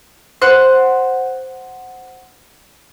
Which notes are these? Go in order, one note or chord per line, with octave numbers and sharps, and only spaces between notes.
C5 F#5 F#6